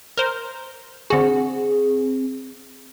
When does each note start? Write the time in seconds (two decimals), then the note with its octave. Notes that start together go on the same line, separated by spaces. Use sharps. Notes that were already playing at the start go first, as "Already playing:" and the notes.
0.17 A#4 C5
1.10 D3 C4 F#4 G#4